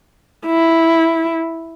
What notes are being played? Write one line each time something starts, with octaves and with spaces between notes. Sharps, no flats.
E4